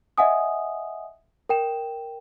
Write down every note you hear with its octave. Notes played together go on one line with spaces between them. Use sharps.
D#5 E5 F#5 G#5 D#6
A#4 G5 E7